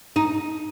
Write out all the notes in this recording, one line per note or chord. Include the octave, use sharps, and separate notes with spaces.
D#4